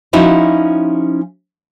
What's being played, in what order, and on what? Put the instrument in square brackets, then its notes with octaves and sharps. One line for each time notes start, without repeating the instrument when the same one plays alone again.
[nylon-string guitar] F3 C#4 D#4 E4 F#4